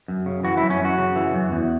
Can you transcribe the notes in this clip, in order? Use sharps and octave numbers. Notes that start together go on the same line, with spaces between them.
F#2
C#3
E3 F#4
F#2 E4
C#4
F#2 F#4
C#3
E3
F#2
E2